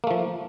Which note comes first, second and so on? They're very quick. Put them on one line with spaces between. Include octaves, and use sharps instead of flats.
A#3 A3 F3